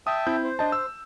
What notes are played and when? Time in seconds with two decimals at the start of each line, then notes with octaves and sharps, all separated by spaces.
0.07 E5 G5 A5 D#6
0.27 C4 E4 G6
0.44 C5
0.59 D4 D#5 A5
0.72 E6